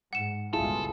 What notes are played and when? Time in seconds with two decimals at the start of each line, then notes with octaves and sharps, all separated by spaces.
0.13 G#2 F#5 E7
0.53 G1 C#2 B2 E4 F4 G#4 A4